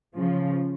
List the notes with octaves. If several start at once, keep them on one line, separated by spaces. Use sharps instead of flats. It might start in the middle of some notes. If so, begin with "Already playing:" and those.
C#3 F3